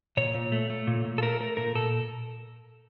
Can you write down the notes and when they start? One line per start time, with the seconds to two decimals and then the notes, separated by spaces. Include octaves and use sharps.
0.17 A#2 C#5
0.35 A#2
0.52 A3
0.70 A3
0.87 A#2
1.05 A#2
1.18 A4
1.22 A3 A#4
1.40 A3 A#4
1.57 A#2 A#4
1.75 A#2 A4